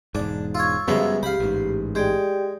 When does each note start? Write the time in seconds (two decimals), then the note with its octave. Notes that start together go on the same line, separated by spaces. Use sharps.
0.15 E1 G#2 D4
0.55 F4 C#5 E6
0.88 F#2 C#3 F3 G3 G#3 B3
1.23 C#2 G4 F5 B5
1.40 A1 G#2
1.95 G#3 G4 D5 G5